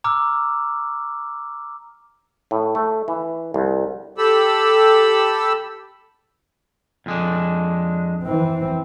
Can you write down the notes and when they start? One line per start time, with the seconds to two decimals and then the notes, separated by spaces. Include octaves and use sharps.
0.04 A#5 D6 E6 F6
2.51 A2
2.75 A3
3.08 E3
3.54 C2
4.18 G4 A4 B5 E6
7.06 F2 G#3 D4
8.24 E3 C4